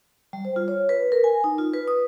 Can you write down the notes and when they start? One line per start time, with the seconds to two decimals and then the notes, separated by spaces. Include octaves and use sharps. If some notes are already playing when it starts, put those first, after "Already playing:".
0.33 G3
0.45 C5
0.56 F4
0.68 C#5
0.89 B4
1.12 A#4
1.24 G#5
1.44 D#4
1.58 F4
1.74 B4
1.88 D#6